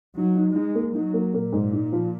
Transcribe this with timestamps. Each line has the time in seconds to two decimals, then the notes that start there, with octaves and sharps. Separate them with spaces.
0.17 F#3 D#4
0.36 D#4
0.56 G#3 D#4
0.75 A#3
0.94 F#3 D#4
1.14 A#3
1.34 A#2 A#3
1.52 G#2
1.73 D#4
1.92 F3